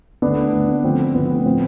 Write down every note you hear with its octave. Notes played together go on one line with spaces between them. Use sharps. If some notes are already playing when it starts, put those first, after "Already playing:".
D3 A3 B3 D4
D3 A3
B3
D3 F3 A3 C4
D3 F3 A3 B3
C4
A2 F3 A3 C4